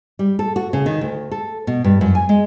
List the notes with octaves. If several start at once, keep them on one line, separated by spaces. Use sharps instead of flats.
G3
A4
F#4
C#3
D#3
D2
A4
B2
G2
F#2
G#5
G#3